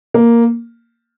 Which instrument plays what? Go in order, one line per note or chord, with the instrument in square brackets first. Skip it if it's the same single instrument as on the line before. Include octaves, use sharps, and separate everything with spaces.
[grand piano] A#3